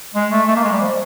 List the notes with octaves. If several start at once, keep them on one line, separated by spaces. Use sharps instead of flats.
G#3
A3
A3
A#3
G#3
G3
F3